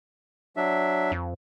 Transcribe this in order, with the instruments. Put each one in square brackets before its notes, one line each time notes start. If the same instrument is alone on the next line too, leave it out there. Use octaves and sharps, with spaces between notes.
[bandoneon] F#3 D4 E5
[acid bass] F2